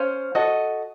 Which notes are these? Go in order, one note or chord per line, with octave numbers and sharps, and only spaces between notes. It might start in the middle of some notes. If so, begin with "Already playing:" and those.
Already playing: C#4 C5 F5
F#4 A4 D#5